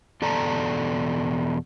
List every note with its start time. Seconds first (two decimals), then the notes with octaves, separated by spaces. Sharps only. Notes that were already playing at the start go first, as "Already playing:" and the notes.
0.22 E2 B2 A4 D5 A5 A#5